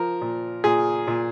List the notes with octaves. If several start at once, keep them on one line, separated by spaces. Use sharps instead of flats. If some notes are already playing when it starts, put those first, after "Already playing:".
Already playing: F3 A#4
A#2
A#2 G#4
A#2